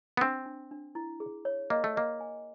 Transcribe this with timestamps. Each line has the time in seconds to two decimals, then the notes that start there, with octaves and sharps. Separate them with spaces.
0.17 B3
0.21 C4 D4
0.46 D4
0.71 D4
0.95 E4
1.20 G#4
1.45 C#5
1.70 A#3 D#5
1.84 A3
1.96 A#3 D#5
2.20 G#5